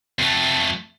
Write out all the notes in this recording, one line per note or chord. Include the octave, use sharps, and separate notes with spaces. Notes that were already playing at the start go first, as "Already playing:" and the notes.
F2 A3